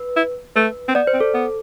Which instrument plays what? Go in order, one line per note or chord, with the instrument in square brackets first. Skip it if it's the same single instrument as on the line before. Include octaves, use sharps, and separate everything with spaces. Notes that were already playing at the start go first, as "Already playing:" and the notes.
Already playing: [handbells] B4
[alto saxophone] E4
[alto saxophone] A3 [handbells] B4
[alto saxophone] C4
[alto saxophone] B3 [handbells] D5
[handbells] C5
[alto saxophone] C4
[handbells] A4
[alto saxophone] B3